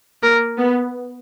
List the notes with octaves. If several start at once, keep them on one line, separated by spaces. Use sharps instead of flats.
A#3 A#4
B3